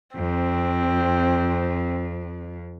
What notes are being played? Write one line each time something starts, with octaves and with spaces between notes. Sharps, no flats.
F2 C4